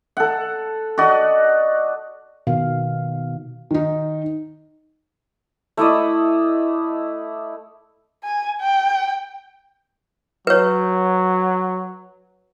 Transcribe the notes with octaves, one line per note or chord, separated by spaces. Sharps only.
A4 F#5
F#4 D5 D#5
B2 D#3 F5
D#3 D#4
A3 E4 D5 D#5
G#5
G5
F#3 B4 C#5